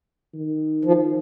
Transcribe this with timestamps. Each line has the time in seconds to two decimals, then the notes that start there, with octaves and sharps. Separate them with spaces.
0.34 D#3
0.85 F3